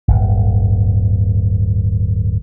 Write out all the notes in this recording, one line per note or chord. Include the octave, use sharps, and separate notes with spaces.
D1 G1